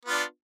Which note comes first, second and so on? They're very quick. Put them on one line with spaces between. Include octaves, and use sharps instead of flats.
B3 F4 D4